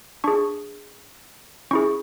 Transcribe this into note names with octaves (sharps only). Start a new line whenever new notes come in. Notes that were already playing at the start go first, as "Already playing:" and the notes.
D4 G#4 C#6
C#4 E4 G#4 C#6